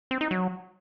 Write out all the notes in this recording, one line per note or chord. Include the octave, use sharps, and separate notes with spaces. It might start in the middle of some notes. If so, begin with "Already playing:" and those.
C4
D#4
F#3